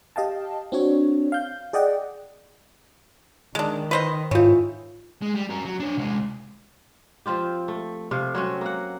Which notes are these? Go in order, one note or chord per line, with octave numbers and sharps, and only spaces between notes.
G4 D#5 F5 G5 A5
C4 D4 F#4 C#5
F5 G6
G#4 D5 D#5 F#5 G5
D#3 G#3 D4
B4 C5 D#5
G#2 E3 D#4 F4 C#5
G#3
G3
F#4 A#4
F#3
D4 C#5
C2 G#3
F3 C4 F4 G4
A3
C3 A3 F5
F#3 C4 C#4
A#3 F#5